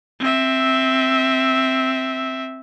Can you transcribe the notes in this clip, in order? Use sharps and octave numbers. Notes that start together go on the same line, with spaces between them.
C4 E5